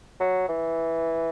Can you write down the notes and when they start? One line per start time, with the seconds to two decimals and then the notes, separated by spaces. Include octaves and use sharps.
0.20 F#3
0.49 E3